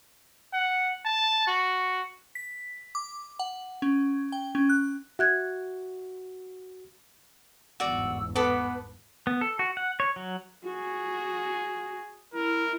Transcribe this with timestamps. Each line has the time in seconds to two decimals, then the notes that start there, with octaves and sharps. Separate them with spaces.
0.54 F#5
1.05 A5
1.47 F#4
2.35 B6
2.95 D6
3.39 F#5
3.82 C#4
4.32 G5
4.55 C#4
4.69 F#6
5.19 F#4 E5 F#6 G#6
7.80 G1 E2 G#2 F#4 D5 E6
8.36 B3 A4 B4 B5 D6
9.27 B3
9.41 A4
9.59 F#4
9.77 F#5
10.00 C#5
10.16 F#3
10.64 F#4 G#4
12.34 E4 A#4